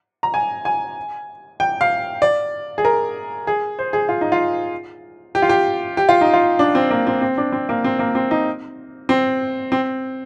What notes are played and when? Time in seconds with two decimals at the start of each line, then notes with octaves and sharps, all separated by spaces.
0.23 A#5
0.34 G#5
0.65 G#5
1.60 G5
1.81 F5
2.22 D5
2.78 G#4
2.85 A#4
3.47 G#4
3.79 C5
3.93 G#4
4.09 F4
4.21 D#4
4.32 F4
5.35 G4
5.42 F4
5.49 G4
5.97 G4
6.09 F4
6.21 D#4
6.33 F4
6.59 D4
6.75 C4
6.91 A#3
7.07 C4
7.21 C4
7.38 D4
7.52 C4
7.69 A#3
7.84 C4
7.99 A#3
8.15 C4
8.31 D#4
9.09 C4
9.72 C4